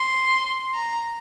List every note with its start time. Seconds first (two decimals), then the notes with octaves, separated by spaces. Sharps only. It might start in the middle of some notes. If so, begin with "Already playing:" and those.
Already playing: C6
0.74 A#5